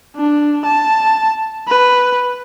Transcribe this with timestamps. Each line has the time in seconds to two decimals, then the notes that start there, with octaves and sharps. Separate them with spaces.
0.16 D4
0.65 A5
1.68 B4